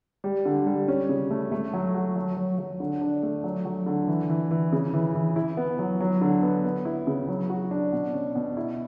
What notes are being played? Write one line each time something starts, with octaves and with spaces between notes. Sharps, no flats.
G3
D3
G3
C#4
C#3
A3
A3
F#3
F#4
F#3
F#3
F#3
D3
D4
A3
F#3
F#3
D3
E3
E3
E3
C#3
E3
E3
E4
B3
F#3
F#3
D3
B3
B3
E4
C#3
F#3
F#4
D4
B2
C#4
B2
E4